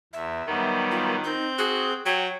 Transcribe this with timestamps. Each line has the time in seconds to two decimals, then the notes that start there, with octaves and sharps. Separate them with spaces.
0.13 E2 E5
0.47 D#3 F#3 G3 B3
0.91 F4
1.24 C4 D#4 G6
1.58 F#4 G#4
2.06 F#3 G5